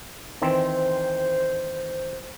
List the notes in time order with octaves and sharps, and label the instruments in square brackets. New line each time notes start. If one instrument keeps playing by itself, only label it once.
[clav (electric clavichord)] D#3 E3 C4 [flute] C5